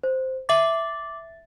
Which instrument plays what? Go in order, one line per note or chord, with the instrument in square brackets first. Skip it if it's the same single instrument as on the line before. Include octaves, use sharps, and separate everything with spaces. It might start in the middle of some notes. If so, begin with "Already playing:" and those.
[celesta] C5
[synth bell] E5 A6 [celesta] D6 F#7